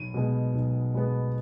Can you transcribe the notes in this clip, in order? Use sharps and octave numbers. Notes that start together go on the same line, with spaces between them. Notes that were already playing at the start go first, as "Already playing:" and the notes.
Already playing: B1 D#7
B2 G#3 B3
B1
B2 G#3 B3